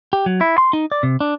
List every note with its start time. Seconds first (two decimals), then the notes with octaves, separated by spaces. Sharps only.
0.13 G4
0.26 F#3
0.41 E4
0.58 C6
0.73 D#4
0.92 D5
1.03 C3
1.21 D4